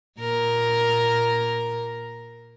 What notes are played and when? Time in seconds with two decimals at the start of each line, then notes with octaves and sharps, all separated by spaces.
0.20 A#2 A#4